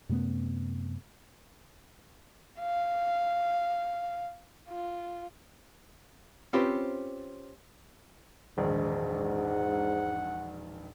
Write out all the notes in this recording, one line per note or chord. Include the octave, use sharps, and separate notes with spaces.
F#2 C3 A3 B3
F5
F4
C4 C#4 F4 G4 B4 C5
E1 A#1 G#2 D#3
F#5